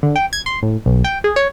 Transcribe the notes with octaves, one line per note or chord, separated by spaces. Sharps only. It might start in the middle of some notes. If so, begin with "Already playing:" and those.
D3
G5
G#6
C6
A2
B1
G5
G#4
C#5